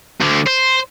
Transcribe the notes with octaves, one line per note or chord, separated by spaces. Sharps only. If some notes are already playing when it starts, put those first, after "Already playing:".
D2 D3
C5